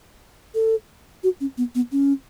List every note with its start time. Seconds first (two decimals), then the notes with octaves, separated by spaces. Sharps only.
0.55 A4
1.24 F#4
1.40 C#4
1.58 B3
1.75 B3
1.92 C#4